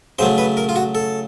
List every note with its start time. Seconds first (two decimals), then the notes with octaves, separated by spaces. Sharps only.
0.19 C#3 F#3 A3 C5
0.38 B4
0.57 A#4
0.69 F4
0.76 F#4
0.95 A4